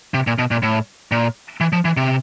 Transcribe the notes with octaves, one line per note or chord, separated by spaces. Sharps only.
C3
A#2
B2
A#2
A2
A#2
E3
F3
E3
C3